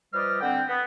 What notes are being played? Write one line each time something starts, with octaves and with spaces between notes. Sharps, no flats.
F3 G3 B4 D5 D#5 F6
D3 C4 F#5 G5
B3